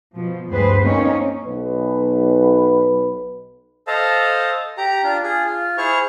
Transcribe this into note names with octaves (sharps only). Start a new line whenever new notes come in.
B2 F3
D2 G2 G#4 B4 C5
A#3 C4 C#4 D#4 C#5
B1 B4
A4 C5 D#5 F5 A5
G4 A#5
D4 F4
F4 G#4
F4
E4 G#4 C5 C#6 F6